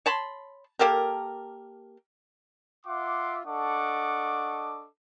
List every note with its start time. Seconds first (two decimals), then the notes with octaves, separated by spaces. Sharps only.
0.06 C#5 A5 B5 C6
0.79 A#3 G4 A4 A#4
2.86 F4 E5 F#5 C6 D6
3.46 D4 A4 D#5 F#5 C#6 D6